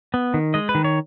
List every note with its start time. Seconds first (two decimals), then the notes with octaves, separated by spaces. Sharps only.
0.14 B3
0.34 D#3
0.54 G#3 D#5
0.69 B4
0.75 D#3
0.84 C#5